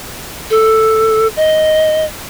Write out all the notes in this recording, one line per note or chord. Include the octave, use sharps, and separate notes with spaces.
A4
D#5